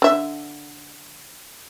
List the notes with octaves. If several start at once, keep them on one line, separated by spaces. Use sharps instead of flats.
D3 E5